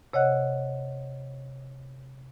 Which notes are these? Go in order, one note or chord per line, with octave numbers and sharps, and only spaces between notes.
C3 C#5 D#5 F#5 F#6